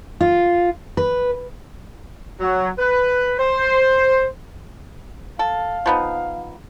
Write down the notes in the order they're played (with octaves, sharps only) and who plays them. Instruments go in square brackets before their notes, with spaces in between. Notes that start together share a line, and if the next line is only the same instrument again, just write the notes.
[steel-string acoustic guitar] F4
B4
[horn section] F#3
B4
C5
[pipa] A4 [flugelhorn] F5
[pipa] F3 B3 D#4